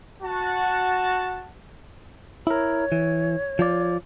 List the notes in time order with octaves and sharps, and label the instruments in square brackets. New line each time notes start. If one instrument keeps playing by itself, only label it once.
[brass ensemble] F#4 A5
[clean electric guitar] E4 A#4 [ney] C#5
[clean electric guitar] E3
F3 F4 D5